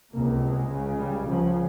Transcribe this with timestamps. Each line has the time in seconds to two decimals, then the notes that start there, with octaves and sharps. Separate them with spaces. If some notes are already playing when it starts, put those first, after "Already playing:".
0.12 C#2 C3 A#3
0.40 G#3
0.70 C#2 C#3
0.98 G3
1.27 C#2 C#3 F3